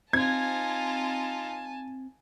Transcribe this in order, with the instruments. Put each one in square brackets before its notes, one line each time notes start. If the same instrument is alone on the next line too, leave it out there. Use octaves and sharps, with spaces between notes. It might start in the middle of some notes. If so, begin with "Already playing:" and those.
[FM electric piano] C4 [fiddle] D#4 F4 [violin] G#5 A5 [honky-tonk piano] G#6